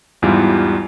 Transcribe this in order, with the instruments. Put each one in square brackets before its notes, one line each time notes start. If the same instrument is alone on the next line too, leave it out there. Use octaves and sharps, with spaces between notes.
[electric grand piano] E2 G#2 G3 E4 F4